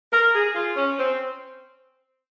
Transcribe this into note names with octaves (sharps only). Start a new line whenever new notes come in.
A#4
G#4
F4
C#4
C4